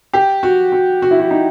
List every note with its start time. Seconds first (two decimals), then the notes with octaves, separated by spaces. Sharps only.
0.13 G4
0.43 F#4
0.72 F#4
1.02 F#4
1.11 E4
1.20 F#4
1.31 D#4